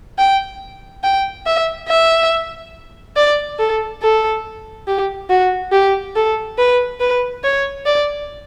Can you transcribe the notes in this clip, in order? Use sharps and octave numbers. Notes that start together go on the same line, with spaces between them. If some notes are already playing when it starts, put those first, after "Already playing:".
G5
G5
E5
E5
D5
A4
A4
G4
F#4
G4
A4
B4
B4
C#5
D5